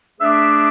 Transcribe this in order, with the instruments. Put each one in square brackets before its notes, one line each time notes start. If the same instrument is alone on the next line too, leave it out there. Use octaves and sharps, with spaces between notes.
[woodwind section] A3 D4 G#4 B4 E5 [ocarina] D6 E6